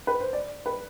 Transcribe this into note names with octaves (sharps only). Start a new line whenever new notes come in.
B4
C5
D5
B4